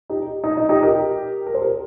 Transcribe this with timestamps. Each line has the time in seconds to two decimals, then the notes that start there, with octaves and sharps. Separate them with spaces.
0.10 D#4 G4
0.44 D#4
0.57 D#4
0.69 D#4 G4
0.83 G4 A#4
1.46 A#4
1.54 C5
1.62 G4 A#4